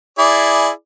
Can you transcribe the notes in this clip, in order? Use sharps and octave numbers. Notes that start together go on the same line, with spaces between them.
E4 G#4 D5